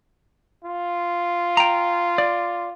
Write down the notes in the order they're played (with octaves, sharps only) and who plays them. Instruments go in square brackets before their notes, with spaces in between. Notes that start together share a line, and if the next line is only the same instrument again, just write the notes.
[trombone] F4
[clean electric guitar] G5 A#5
D5